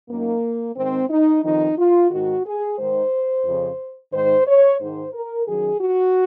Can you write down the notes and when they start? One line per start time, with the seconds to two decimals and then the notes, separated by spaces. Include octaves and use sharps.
0.09 F#2 D#3 A#3
0.76 G#2 D#3 C4
1.10 D#4
1.44 F2 D#3 D#4
1.78 F4
2.11 G#2 D#3 F#4
2.45 G#4
2.78 G#2 D#3 C5
3.45 F2 C#3
4.13 G#2 D#3 C5
4.47 C#5
4.80 G#2 D#3 C5
5.13 A#4
5.47 F#2 D#3 G#4
5.81 F#4